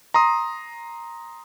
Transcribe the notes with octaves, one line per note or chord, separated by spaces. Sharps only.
A#5 C6 D#6